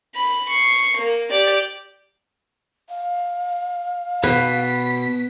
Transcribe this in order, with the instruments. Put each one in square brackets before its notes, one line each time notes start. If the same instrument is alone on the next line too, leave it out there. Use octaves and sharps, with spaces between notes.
[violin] B5
C#6 C7
A#3
G4 D5
[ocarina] F5
[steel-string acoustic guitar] B2 [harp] B4 [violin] B6